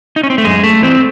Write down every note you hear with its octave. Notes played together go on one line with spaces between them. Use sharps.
D#4
C#4
C4
A3
F#2 G#3
A3
E3 C4